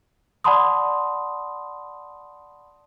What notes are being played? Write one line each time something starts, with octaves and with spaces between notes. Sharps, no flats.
D5 F#5 A5 B5 C6 D#6